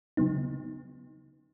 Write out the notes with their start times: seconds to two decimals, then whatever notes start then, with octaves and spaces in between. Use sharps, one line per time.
0.17 C#3 F#3 B3 D#4